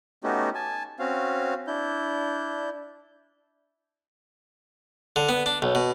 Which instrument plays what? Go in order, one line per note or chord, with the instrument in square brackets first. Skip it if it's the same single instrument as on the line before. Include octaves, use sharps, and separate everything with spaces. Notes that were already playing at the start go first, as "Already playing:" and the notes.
[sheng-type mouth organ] A3 B3 C#4 D#4 F#4 G4
G#5 A5
C4 C#4 F#4 F5
D4 E4 G6
[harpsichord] D3
B3
D4
B1
B2